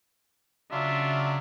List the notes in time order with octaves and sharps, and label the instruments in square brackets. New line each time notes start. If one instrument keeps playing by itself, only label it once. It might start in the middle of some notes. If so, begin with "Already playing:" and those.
[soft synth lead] C#3 [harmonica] F#3 D4 F4 [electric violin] E5